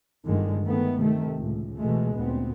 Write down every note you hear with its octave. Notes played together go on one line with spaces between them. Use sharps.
G1 D3 D#3 G#3
D#3 A3 B3
C3 D#3 A3
C#2 A2
B2 E3 G#3 A3
D2 A#2 B3 C4